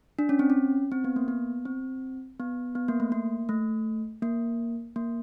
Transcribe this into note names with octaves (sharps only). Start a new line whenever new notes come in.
D4
C#4
C4
C#4
C4
B3
A#3
B3
C4
B3
B3
A#3
A3
A#3
A3
A#3
A#3